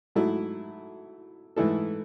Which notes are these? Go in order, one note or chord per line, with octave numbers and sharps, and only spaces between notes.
G#2 F#3 A3 E4
G#2 E3 A3 E4 A4